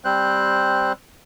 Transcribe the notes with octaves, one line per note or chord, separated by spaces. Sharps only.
G3 C4 C5 F#6